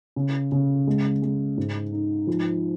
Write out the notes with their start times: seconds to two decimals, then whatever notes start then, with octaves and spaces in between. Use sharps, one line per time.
0.16 C#3
0.52 C#3
0.87 G#3
1.22 G#3
1.57 G#2
1.92 D#4
2.27 F3